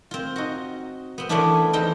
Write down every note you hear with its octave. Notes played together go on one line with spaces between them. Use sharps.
C4 F4
D#4 F#4
B3 C4
E3 A3 B3 C#4 D4 E4
E2 C4 D#4 G5